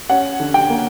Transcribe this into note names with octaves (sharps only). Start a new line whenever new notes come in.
C#4 F#5
D3
G5
A#3